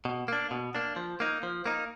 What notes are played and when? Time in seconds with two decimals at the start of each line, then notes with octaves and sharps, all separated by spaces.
0.05 B2
0.28 A#3 D4
0.51 B2
0.75 A#3 D4
0.96 F3
1.20 A#3 D#4
1.43 F3
1.66 A#3 D#4